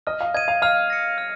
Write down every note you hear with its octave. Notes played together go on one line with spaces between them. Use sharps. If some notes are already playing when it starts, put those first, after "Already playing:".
D#5 F6
F5
D#5 G#6 D#7
F5
F5 F6
A#6 C#7
F6